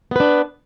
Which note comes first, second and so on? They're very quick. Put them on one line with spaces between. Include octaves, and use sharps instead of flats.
B3 B4 D4